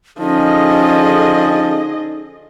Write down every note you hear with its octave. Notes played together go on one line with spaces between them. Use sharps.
D3 F3 C#4 D#4 G#4 D#5